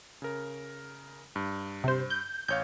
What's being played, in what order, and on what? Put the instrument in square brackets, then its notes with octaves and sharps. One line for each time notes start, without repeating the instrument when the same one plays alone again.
[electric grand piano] C#3 A#4
G2
[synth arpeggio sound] C3 C5
G6
[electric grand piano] A1 C#5 F5 [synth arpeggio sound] G6